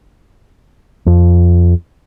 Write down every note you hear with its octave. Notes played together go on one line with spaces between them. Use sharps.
F2